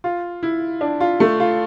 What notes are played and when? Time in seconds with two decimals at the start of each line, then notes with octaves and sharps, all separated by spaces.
0.04 F4
0.43 E4
0.81 D4
1.00 F4
1.20 A3
1.40 F4